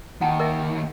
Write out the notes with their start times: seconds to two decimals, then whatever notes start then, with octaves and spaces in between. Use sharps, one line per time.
0.21 D#2 D#3 F#5 A5
0.40 A#4 D#5 E5